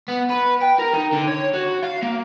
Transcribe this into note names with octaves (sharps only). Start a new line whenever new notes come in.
B3
B4
G5
A#4
D#4
D3
C#5
F#4
F5
A#3